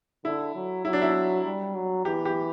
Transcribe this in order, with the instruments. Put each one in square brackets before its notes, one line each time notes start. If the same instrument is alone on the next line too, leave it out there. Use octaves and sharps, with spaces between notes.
[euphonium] D3 [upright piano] E4
[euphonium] F#3
[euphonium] F#3 [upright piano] E4
[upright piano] D4
E4
[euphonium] G3
F#3
[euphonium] E3 [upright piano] G4
[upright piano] G4